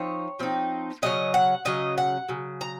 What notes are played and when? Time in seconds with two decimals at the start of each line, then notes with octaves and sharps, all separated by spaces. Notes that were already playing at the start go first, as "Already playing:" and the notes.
Already playing: F3 C4 D#4 C#5
0.39 F3 C4 D#4
1.02 C#3 F#3 C#4 D#5
1.34 F#5
1.65 C#3 F#3 C#4 D#5
1.98 F#5
2.29 C#3 F#3
2.61 A#5